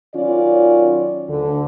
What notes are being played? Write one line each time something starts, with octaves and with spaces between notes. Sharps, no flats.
D#3 F#3 C#4 F4 D5
D2 D3